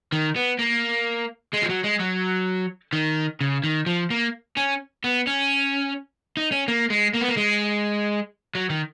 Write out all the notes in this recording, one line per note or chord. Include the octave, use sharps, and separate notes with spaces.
D#3
B3
A#3
G#3
F3
F#3
G#3
F#3
D#3
C#3
D#3
F3
A#3
C#4
B3
C#4
D#4
C#4
A#3
G#3
A#3
B3
A#3
G#3
F#3
D#3